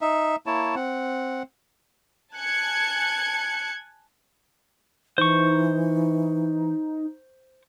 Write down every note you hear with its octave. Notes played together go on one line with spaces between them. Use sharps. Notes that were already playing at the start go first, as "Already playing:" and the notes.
D#4 E5
A#3 E4 C#5 A5
C4 F#5
G#5 A5 F#6 G#6 C#7
E3 D#4 C5 C#6